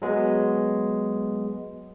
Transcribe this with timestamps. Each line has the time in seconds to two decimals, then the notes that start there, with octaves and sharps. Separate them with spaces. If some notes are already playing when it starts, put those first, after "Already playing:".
0.02 F#3 G#3 B3